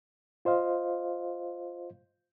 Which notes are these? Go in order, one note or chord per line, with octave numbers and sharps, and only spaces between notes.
F4 C5 D#5 F5